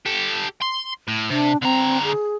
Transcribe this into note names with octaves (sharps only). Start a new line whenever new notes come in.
G4 A4
C6
A2
C3 D4
D3 C4 A#5
G#4